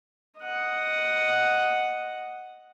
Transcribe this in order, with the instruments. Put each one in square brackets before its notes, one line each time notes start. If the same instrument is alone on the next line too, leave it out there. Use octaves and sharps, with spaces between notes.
[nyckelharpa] D#5 F#5